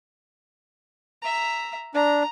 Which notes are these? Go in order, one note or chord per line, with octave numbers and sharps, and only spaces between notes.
E5 A#5
D4 A#5